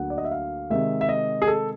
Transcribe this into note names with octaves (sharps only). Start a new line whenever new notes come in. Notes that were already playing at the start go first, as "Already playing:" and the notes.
Already playing: D2 D3 F#3 A#3 F#5
D5
D#5
E5
F5
C3 D#3 G#3 E5
E5
D#5
G#4
A4